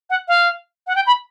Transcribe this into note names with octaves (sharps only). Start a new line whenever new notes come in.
F#5
F5
F#5
G5
B5